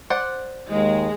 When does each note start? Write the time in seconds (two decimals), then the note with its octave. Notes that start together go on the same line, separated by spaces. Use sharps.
0.10 C5 D5 F#5
0.70 D#2 G#3 D#5